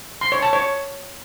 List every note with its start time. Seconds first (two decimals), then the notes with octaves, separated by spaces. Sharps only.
0.21 C6
0.32 C#5
0.42 A5
0.53 C#5